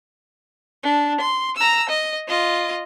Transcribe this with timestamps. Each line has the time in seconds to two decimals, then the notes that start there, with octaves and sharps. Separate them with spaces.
0.83 D4
1.21 C6
1.57 A#5 E6
1.89 D#5
2.28 F4 D#5